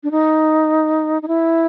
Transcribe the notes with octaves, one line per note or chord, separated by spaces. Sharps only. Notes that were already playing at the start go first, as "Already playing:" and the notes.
D4
D#4
D#4
E4